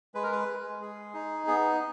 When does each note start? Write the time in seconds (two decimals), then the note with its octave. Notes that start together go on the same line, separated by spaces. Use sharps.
0.15 G#3 B4
0.23 A#4
0.32 B4
0.48 G#3
0.81 G#4
1.14 D#4
1.47 B3 G#4